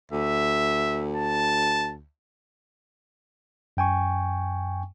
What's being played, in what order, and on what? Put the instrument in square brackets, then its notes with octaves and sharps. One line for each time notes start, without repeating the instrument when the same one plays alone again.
[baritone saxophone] D2 [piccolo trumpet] E5
[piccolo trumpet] A5
[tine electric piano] F#2 G5 G#5 C#6